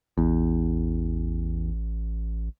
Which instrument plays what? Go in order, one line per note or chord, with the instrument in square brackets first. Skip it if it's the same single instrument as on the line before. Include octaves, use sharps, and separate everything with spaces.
[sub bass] A1 [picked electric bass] E2